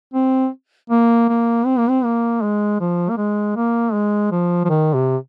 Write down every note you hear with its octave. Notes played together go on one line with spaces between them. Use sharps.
C4
A#3
A#3
C4
A#3
C4
A#3
G#3
F3
A#3
G#3
A#3
G#3
F3
F3
D#3
C3